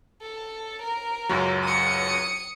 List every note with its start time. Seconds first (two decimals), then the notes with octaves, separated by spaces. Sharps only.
0.22 A4
0.82 A#4
1.29 C#2 F#2 F#3
1.64 D#6 C#7